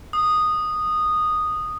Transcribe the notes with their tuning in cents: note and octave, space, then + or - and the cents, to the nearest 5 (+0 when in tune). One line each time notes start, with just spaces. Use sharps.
D#6 -10